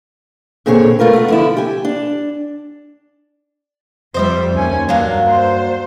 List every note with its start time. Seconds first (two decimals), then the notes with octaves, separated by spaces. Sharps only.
0.66 A#2 D3 C4 G#4 C#5
0.99 A3 F4 A#4 B4
1.13 A3 B3
1.28 D3 F3 E4
1.57 G4 G#5
1.85 D4
4.14 F2 G3 C5 D#5 E5
4.53 D#2 C#4 G#5
4.89 G2 F#3 A#3 D4
5.27 C5